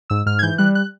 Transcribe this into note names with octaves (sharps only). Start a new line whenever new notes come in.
G#2 E6
G#2 F6
G#6
E3 G6
G3 F#6
F#6